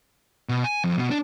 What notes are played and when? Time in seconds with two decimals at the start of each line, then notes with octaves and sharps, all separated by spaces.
0.49 B2
0.64 G#5
0.84 F2
0.97 B2
1.10 D4